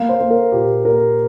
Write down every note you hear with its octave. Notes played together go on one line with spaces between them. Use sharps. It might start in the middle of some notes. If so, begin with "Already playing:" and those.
Already playing: A#3 F5
C5
A#3
A#4
A#2 G4
A#3 A#4